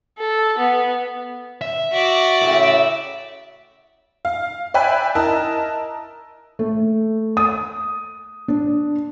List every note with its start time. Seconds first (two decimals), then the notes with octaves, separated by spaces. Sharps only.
0.18 A4
0.58 B3
1.61 E5
1.92 F#4 D5
2.41 A2 C#3
4.25 F5
4.74 D5 E5 G5 G#5 B5 F#6
5.15 E4 A#4 D#5 A5
6.59 A3
7.37 D#6
8.48 D4